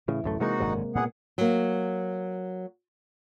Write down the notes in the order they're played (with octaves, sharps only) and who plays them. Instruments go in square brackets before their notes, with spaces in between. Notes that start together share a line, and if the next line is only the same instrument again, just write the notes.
[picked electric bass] A2 C#3 [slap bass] E3
[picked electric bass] D1 F#2 A3
[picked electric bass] C3 G#3 A#3 [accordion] D#4 F#4 F#5
[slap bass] G#1 F#2 D3
[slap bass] A#2 G3 B3 [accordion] G#4 F#5
[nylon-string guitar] F#3 A#3